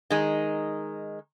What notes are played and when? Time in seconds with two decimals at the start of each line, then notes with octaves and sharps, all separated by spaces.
0.10 D#3 G#3 D#4